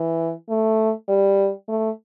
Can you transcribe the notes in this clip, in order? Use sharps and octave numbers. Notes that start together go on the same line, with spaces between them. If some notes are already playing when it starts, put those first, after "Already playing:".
Already playing: E3
A3
G3
A3